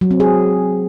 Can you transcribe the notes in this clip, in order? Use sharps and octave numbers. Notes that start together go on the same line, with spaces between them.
F#3
C4
G#4